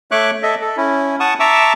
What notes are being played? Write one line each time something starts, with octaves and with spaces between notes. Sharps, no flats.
A3 C#5 E5 C#6 D6 F#6
A4 D#5 E5
A4
C#4 E4
F#5 A5 C#6 D#6
E5 A5 A#5 C#6 D6 E6